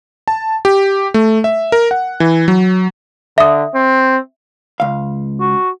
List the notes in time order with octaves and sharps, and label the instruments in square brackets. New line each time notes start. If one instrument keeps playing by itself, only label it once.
[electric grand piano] A5
G4
A3
E5
A#4
F#5
E3
F#3
[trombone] D3 [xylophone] E5 D#6
[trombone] C4
[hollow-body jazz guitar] C#2 F5
[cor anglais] F#4